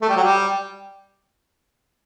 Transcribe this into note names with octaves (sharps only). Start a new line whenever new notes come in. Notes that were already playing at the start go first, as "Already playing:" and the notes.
A3
G3
F#3
G3